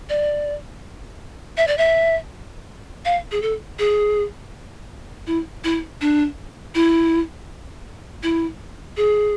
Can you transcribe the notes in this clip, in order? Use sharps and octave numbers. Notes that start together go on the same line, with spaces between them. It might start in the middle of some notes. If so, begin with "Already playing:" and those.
D5
E5
D5
E5
F5
G#4
A4
G#4
E4
E4
D4
E4
E4
G#4